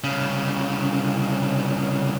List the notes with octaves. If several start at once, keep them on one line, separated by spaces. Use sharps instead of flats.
C2 C#3